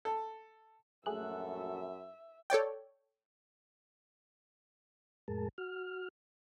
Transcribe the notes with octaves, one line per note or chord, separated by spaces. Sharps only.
A4
A#1 F#2 A3 F#4 G#4 A4 E5 F#6
A4 C#5 D5 G5
F2 A2 G#3 G#4 A#4 A5
F#4 F6